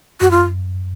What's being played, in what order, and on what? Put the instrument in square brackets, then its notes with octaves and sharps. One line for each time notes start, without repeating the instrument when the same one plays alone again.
[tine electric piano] F#2 [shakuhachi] F#4
[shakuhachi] F4